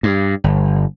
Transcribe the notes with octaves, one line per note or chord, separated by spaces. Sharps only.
G2
G1